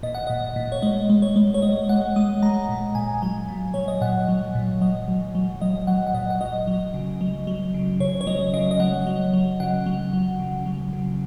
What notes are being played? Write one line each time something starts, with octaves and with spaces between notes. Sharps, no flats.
A#2 D#5
F#5
A#2 D#5
A#2
C#5
G#3 D#5
G#3
C#5
G#3
C#5
G#3 D#5
G#3 F#5
G#3 D#6
G#3 A#5
A#2
A#2 G#5
F#3 G#5
A#2
F#3 C#5
D#5
A#2 F#5
F#3
A#2
F#3 D#5
F#3
F#3
F#3 D#5
F#3 F#5
F#5
A#2 D#5
F#5
F#3 D#5
F#3
C#3
F#3
F#3
C#3
C#3 C#5
C#5
F#3 D#5
C#3 D#5
D#5
F#3 F#5
F#3
F#3
C#3 F#5
F#3
F#3
C#3
F#3
C#3